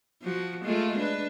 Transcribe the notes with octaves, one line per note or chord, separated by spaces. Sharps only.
F3 F#4
G#3 A3 F4
D4 B4